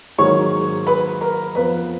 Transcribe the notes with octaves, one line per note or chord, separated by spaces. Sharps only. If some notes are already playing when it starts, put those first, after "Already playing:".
G#2 D#3 F#3 A#3 C#5 C#6
B4 B5
A#4 A#5
F2 F3 B3 B4 B5